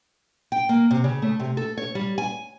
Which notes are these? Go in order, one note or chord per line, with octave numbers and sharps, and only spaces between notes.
G5
A#3
C3
C#3
A3
C3
A4
C#5
G3
G#5